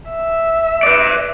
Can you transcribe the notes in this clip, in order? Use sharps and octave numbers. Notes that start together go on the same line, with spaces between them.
E5
B4 D5